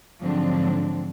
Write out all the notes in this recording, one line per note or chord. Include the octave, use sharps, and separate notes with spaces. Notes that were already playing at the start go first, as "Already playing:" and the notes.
G#2 D3 F3 F#3 C4 D4